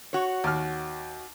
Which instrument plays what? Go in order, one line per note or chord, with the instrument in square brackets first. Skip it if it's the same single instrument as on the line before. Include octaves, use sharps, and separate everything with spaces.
[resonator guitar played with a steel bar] F#4 C#5
[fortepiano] D#2 F6